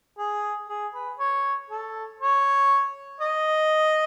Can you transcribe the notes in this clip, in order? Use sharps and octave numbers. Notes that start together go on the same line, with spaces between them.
G#4
G#4
B4
C#5
A4
C#5
D#5